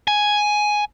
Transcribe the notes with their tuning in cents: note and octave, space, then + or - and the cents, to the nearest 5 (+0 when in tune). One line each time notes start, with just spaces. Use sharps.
G#5 +5